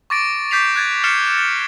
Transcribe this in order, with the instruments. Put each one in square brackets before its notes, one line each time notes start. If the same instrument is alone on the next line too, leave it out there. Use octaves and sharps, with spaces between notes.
[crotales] C#6 D6 A6 A#6 D7
D6 G6 A6 B6 C7 F7
F#6 G#6 A6
F6 A6 C7 C#7 E7 F7
A6